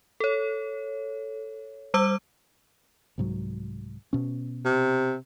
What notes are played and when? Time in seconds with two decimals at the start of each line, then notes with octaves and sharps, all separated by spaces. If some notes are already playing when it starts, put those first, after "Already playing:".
0.20 A4 C#5
1.94 G3 C5 D6 E6
3.18 C2 G#2 F#3
4.13 B2 C#4
4.65 C3